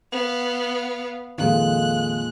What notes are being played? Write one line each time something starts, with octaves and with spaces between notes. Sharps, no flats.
B3 F5
F2 A#2 D#3 G#3 A4 F5 F#6